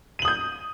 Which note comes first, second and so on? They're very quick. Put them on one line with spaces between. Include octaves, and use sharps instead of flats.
D#7 F#7 D#6 G6